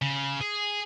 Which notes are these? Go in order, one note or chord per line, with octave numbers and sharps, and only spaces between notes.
C#3
G#4